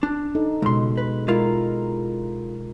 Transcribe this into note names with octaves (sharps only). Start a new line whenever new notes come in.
D4
D#4 A4
C#2 B2 G#3 C6
B4
G#3 E4 F4 A#4